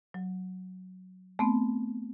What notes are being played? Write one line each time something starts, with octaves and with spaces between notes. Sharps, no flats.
F#3
A3 B3 C4